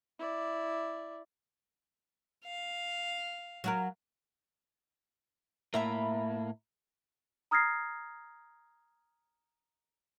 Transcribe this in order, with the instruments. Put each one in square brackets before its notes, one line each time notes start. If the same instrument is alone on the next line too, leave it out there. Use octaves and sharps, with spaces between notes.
[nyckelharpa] E4 D5
[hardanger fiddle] F5
[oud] F#3 F#4 A#4
[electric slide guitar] A2 A#3 [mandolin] E5 A#5 B5
[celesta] A#5 D#6 F6 G#6 A#6 C7